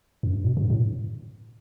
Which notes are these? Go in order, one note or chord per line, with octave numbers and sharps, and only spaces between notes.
F#2
G2
B2
B2
G2
A2